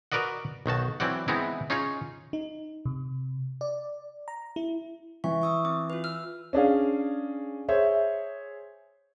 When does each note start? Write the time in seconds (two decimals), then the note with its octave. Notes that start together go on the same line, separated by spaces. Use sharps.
0.12 F#4 A#4 B4 D5 D#5 F#5
0.66 B1 D#3 F#4 A5
1.00 E3 F#3 C4 D5 F#5
1.28 E3 G#3 B3 C4 D#4 E4
1.70 C#4 D#4 F4 G#4 C#5
2.33 D#4
2.85 C3
3.61 D5
4.28 A#5
4.56 E4
5.24 E3 E5 C#6
5.42 C#6 D#6 E6
5.65 C4 D6
5.90 F4 B4
6.04 E6 F6
6.53 C#4 D4 G#4 F5
7.69 G#4 C5 C#5 E5